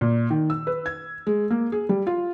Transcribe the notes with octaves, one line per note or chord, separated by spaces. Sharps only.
A#2
D#3
E6
B4
G#6
G#3
A#3
G#4
G3
F4